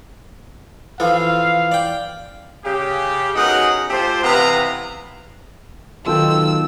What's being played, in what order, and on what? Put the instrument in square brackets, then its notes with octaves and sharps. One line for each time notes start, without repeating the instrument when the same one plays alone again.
[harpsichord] E3 F3 A4 [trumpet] F5
[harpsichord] D5 G5
[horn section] C#3 G4
B2 C#4 D#4 G#4 A#4 F#5
A3 F4 G4 C5
C3 E3 B3 B4 F5 A#5
[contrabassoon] B1 [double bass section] D#3 [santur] F4 A4 G5 [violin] E6